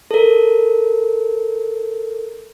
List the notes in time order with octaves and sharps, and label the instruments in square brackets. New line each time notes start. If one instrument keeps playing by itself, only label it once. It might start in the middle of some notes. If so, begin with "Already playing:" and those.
[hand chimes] A4 A#4